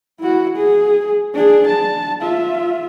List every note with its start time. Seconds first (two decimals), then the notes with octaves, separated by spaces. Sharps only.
0.20 E4 F#4
0.57 G#4
1.34 D4 G#4
1.67 A5
2.22 F4 E5